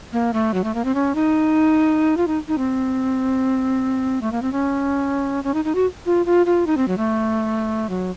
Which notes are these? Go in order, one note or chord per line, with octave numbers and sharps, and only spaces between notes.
A#3
A3
F#3
A3
A#3
C4
C#4
D#4
F4
D#4
D#4
C4
A3
A#3
C4
C#4
C#4
D#4
D#4
F#4
F4
F4
F4
D#4
C4
F#3
A3
F#3